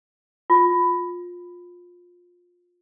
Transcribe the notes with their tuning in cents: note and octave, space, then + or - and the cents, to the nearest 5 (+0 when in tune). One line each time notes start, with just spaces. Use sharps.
F4 +20